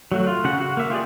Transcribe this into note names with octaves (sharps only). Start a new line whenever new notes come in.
F#3 A3 F#4
F4
C#3 F#4 F#5
F#4
A#3 E5
F4 G4 G#4 D5